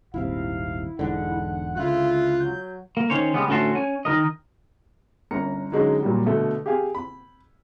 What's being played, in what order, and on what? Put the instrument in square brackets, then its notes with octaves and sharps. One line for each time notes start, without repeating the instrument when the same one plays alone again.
[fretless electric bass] D#1 G#1 C3 [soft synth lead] E4 [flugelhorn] F5
[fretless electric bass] E1 G#2 D3 [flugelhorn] F#5
[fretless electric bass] C#2 D3 [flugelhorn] E4 [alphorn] F4 [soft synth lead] F#6
[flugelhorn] F#3 [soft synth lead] G6
[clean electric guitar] A#3
D#3 C#4 C5 C#5
C#3 G3 G#3 B3
D2 A2 C#4 F#4 A5 C6
C#4 G#5
D#3 F3 A#4 D#5
[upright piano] G1 C#4 A#4 A#5 C#7
D3 F#3 G#3 C#4 D#4
A#2 F#3 G3
B2 D3 A3 A4
G4 G#4 F5 G#5
B5